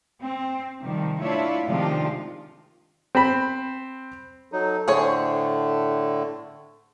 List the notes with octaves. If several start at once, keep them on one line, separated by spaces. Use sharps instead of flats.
C4
C3 D#3 F3 G3
A3 D4 E4 F4 C#5 E5
C3 D#3 F3 G#3 D4 F4
C4 B5
F#3 D#4 A4
A2 D3 A3 G#4 C5 C#5